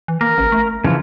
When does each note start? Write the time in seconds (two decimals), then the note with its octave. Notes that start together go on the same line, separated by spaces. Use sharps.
0.08 E3
0.21 A#3 A#4
0.38 A1
0.52 A3
0.84 C#3 E3 F3 F4